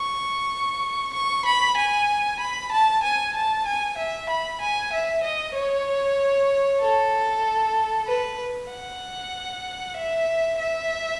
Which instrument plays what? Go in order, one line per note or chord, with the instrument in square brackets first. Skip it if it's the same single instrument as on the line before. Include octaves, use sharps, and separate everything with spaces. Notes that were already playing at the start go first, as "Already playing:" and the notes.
Already playing: [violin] C#6
C#6
B5
G#5
B5
A5
G#5
A5
G#5
E5
B5
G#5
E5
D#5
C#5
A4
B4
F#5
E5
E5